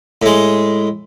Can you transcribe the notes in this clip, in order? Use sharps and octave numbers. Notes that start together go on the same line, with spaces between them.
A2 G#3